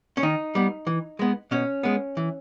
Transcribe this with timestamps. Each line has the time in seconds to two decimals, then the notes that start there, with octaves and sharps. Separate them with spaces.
0.17 C#4
0.23 D#3 D#4
0.55 G3 B3
0.87 E3
1.19 G#3 B3
1.51 B2 C#4
1.83 G#3 B3
2.17 E3